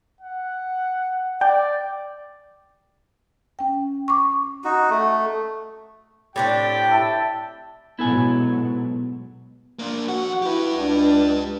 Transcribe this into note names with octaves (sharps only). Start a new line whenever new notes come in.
F#5
D5 G5
C#4 G5
C#6 D6
D#4 F#4
A3
A2 C4 D4 G4 G5
E4 E5 A5
G#2 B2 F#3 B3 E4 A4 G#5
A#3 D4
F2 F#4 F#5
E4 G4 B4
C#2 D4